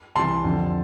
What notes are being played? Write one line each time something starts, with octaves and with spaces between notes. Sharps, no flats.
C2 C3 E3 A5 C6
F2 D3